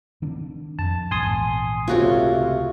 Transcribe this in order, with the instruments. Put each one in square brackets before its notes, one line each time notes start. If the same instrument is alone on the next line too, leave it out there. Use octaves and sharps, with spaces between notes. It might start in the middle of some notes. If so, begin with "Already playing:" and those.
[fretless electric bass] D#3 C4 D4
[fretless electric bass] F2 [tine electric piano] A5
[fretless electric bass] A#1 E2 G#2 [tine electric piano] G#5 C6 D#6
[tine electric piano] C#2 C3 A3 [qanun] F4 F#4 C#5